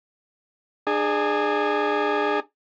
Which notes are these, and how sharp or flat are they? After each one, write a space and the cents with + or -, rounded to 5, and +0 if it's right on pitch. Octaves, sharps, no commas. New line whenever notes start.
D4 +35 G#4 +0